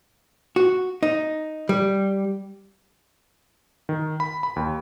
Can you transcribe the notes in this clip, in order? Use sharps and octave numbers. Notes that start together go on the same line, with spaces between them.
F#4
D#4
G3
D#3
B5
B5
D#2